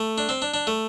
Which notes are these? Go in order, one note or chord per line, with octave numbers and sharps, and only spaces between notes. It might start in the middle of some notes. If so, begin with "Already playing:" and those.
Already playing: A3
D4
C4
D4
D4
A3